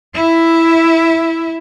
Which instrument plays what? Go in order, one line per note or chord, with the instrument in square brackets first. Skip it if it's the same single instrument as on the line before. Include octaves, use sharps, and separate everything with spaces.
[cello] E4 E5